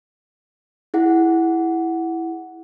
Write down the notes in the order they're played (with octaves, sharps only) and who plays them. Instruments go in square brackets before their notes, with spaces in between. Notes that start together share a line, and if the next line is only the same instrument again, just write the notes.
[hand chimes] E4 G#4 F#5